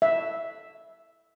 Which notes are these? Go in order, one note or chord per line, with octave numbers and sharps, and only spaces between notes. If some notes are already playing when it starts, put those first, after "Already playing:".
E5